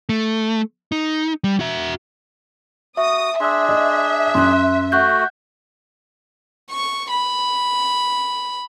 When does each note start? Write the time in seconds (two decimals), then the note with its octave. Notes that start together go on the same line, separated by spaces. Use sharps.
0.09 A3
0.92 D#4
1.44 G3
1.60 F#4 E5
2.97 F#4 E5 D#6
3.40 D4 G#4 E5 C6 E6
3.69 D#5
4.35 F#2 C6 F#6
4.92 A3 F#4 F#5 F#6 G6
6.70 C#6
7.11 B5